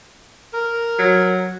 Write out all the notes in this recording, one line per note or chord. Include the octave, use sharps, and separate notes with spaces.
A#4
F#3